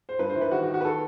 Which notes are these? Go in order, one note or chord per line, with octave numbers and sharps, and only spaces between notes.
C5
G2 B4
C5
E3
B4
D#3 F#4
F#4
D#3
F#4
B4
D#3 A4